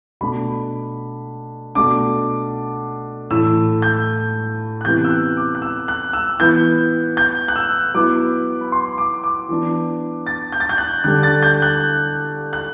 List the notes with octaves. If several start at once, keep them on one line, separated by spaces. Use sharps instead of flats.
B2 A3 D4 B5
B2 A3 D4 D6
A2 E3 A3 E6
G6
F#6
C3 E3 B3 E4 G6
E6
F#6
D6
F#6
E6
F#6
E6
E3 B3 E4 G6
G6
F#6
E6
F#3 B3 E4 D6
B5
C6
D6
D6
E3 B3 D4
A6
G6
A6
G6
F#6
D3 G3 D4 F#6
A6
G6
F#6
F#6